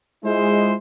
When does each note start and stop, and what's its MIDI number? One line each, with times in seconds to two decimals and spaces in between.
0.24 0.73 56
0.24 0.74 64
0.24 0.74 65
0.24 0.74 72